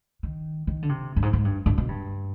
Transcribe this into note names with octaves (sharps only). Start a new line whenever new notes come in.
D#3
D#3
D3
C3
G2
G#2
G#2
G2
G2
B2
G2